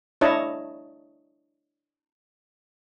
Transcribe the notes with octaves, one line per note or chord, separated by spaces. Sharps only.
D4 E4 C#5 D#5 A5